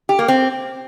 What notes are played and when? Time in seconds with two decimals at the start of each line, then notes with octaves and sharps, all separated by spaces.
0.09 G4
0.19 A#3
0.28 C4